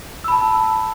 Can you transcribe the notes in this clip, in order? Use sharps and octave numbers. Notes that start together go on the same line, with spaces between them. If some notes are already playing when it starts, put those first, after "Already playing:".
A5 B5 E6